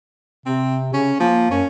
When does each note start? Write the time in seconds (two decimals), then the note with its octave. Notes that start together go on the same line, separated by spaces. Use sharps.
0.46 C3 C4
0.94 C#3 C#4
1.20 F3 A#3
1.51 F#2 C#4